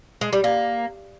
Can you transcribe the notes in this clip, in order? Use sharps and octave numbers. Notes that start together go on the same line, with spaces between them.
G#3
G3
A#3